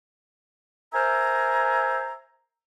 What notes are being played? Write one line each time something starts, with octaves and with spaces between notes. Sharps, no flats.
A#4 C5 E5 G#5 A#5